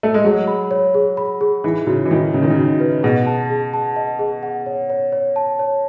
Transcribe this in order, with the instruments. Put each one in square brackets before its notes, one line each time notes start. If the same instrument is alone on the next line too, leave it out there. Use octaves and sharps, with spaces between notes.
[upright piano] A3
G#3
[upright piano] F#3 [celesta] G#4
[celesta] B5
C#5
G#4
B5
G#4
[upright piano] E3 [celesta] D#4
[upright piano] C#3 [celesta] F#4
[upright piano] E3
[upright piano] D#3 [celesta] D#4
[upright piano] C#3 [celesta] D#4
[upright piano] D#3
C#3
[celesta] F#4
B4
[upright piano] B2 [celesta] G#4
[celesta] A5
G#4
A5
D#5
G#4
F#5
C#5
C#5
C#5
A5
C#5